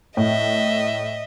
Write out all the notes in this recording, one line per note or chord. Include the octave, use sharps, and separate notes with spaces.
A2 D#5 E5